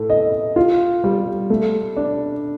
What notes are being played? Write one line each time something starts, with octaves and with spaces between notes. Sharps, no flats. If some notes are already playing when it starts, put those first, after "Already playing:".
Already playing: A2 A4
D#5
F4
G3
A3
D4